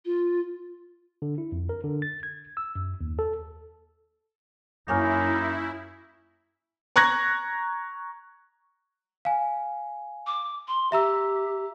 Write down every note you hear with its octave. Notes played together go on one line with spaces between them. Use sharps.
F4
D3
E4
F2
A#4
D3
A6
G#6
E6
F#2
D#2
A4
F#2 A#3 C#4 D#4 E4 A#4
A#5 C#6 F#6 G#6 A#6
F5 G#5
D6
C6
G4 E5 A#5 E6